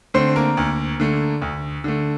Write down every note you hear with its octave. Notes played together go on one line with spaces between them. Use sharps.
D3 A3 C4 C5
A#3 A#4
D2
D3 A3
D2
D3 A3